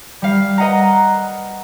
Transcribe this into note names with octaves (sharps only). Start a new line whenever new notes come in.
G3 F5
B4 D#5 F#5 A#5